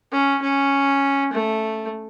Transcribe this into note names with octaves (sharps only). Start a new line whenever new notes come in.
C#4
C#4
A3